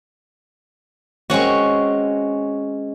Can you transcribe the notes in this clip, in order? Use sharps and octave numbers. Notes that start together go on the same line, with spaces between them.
G#3 C4 C#4 F#4